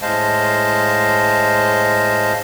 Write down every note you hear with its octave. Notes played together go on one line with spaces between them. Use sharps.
A2 G#3 C5 D#5 F5 A5